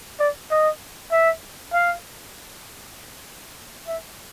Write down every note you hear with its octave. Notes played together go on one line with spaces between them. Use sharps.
D5
D#5
E5
F5
E5